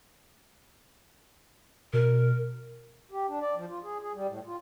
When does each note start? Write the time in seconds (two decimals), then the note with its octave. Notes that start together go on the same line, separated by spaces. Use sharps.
1.93 B2 A#4
3.11 G4
3.28 D4
3.41 D5
3.55 F3
3.69 F4
3.84 G#4
4.01 G#4
4.14 G3
4.27 A2
4.46 F4